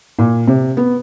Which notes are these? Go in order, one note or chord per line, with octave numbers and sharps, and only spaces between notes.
A#2
C3
B3